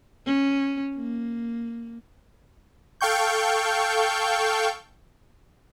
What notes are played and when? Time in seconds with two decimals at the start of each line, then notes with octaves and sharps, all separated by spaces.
0.26 C#4
0.95 A#3
3.01 A4 F5 G5 C#6 G6